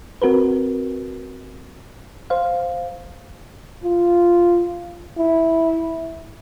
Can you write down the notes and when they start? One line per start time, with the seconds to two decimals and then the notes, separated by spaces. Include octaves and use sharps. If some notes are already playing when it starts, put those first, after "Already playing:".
0.22 C4 F#4 A#4 B4
2.30 C5 F5
3.84 F4
5.18 E4